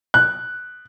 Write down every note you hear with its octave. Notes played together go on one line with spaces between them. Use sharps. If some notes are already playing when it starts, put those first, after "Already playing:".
F#6